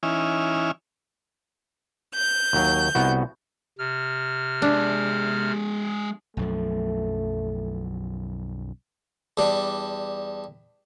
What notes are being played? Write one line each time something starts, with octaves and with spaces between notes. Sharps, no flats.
E3 C#4 D#4 E4 G#5 F6
G6
D#2 F#3
C2 B3 F#4
C3 F6
G#3 D4 E5
B1 F#2 F3 A3
E2 G3 D4